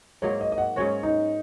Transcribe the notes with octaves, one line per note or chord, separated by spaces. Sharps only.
G#2 F#3 A#3 C#5
D#5
D#5
F#5
G#2 F#3 C#4 F#4 C#5
D#4